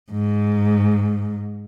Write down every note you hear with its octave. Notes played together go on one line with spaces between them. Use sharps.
G#2